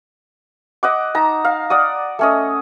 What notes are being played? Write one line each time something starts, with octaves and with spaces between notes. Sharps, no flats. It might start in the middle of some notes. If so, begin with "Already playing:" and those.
D#5 F#5 D6
D#4 A5 A#5
F5
D5 F#5 D#6
A3 C#4 D#5